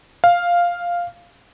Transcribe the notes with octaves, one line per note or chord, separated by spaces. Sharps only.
F5